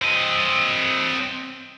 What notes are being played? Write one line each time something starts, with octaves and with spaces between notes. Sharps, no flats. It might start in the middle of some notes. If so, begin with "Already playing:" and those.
C4 D#5